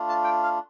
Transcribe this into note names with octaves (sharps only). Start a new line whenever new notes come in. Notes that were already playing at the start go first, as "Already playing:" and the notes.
Already playing: A3 D4 F4
A5
G5
F5